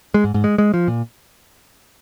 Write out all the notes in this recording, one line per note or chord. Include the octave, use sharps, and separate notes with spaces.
G#3
G#2
G#2
G#3
G#3
F3
A#2